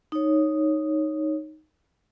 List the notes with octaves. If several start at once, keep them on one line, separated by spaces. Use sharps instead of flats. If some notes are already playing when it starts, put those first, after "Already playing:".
D#4 C#5